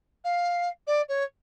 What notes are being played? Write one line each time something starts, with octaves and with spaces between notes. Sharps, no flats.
F5
D5
C#5